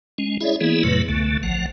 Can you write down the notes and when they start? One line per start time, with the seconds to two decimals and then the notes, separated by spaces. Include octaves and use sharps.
0.18 G#3 C#4
0.41 E4 G#4 C#5 D5 E5
0.61 E3 A#3 B3 E4 G#4
0.83 F2 A2 C3 F#3 A3 B4
1.09 C#2 D3 A3
1.43 A1 F3 F#5